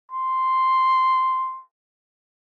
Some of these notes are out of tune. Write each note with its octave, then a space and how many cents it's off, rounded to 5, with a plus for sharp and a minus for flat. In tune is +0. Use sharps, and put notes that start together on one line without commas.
C6 -5